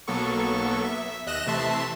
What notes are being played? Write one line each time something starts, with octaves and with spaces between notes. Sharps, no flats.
B1 F#3 A#3 B3 A4 C#6
E5
D#2 D#5 F#6 A#6 E7
C3 E3 A3 E5 A5 C6